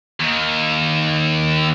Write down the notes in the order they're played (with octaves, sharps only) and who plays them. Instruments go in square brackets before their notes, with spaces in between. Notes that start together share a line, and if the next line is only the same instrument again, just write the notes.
[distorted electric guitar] D#2 D#3